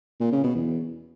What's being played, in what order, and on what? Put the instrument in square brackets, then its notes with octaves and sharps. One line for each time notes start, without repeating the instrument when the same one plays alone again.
[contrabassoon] A#2
C#3
B2
E2